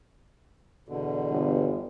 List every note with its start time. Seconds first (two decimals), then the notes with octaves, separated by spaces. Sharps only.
0.88 E2 B2 D3
1.30 G1